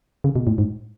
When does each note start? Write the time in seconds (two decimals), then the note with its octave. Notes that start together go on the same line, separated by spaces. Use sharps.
0.24 C#3
0.36 B2
0.47 A2
0.58 G#2